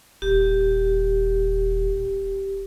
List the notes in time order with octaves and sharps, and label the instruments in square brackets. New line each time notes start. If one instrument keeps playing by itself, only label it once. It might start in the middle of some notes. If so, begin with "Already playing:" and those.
[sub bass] D#1 [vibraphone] G4